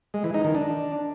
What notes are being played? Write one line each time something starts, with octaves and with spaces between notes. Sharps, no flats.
G#3
E3
D#4
D#3
D4